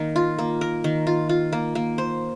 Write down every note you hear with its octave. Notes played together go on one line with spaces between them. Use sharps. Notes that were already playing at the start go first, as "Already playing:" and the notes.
Already playing: D#3 A#3 A#4
F4
A#3
A#4
D#3
F4
F4
A#3
A#3
C5